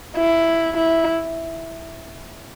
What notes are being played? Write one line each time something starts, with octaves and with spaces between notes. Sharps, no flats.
E4
E4